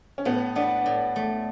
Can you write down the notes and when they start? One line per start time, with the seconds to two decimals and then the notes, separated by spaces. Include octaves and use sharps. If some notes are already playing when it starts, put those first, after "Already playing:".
0.18 C#4
0.25 A2 B3
0.56 B3 D4
0.86 A2
1.16 A3